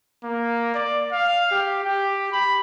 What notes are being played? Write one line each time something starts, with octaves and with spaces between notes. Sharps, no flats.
A#3
D5
F5
G4
G4
B5